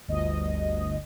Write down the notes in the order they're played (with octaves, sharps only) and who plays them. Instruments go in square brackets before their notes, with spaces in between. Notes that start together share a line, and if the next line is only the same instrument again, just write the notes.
[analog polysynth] G1 D2 D#5